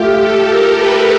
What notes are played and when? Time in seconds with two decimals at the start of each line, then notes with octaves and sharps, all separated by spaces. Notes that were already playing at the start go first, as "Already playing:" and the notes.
Already playing: A3 F4 G4
0.19 A4
0.48 A#4
0.78 B4